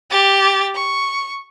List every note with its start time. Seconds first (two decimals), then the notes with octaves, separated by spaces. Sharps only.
0.11 G4 A6
0.75 C#6